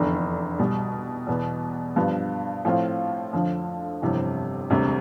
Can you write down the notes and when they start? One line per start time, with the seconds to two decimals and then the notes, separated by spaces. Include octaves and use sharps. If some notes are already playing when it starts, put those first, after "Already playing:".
Already playing: F1 E2 D3
0.59 C2 B2 G3
1.27 E2 B2 B3
1.96 G2 F3 B3
2.65 A2 F3 C4 F4
3.33 F2 D3 F3
4.02 G1 F2 C3 E3
4.70 E1 D2 C3 G3